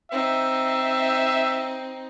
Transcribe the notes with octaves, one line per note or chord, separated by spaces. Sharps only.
C4 D#4 E5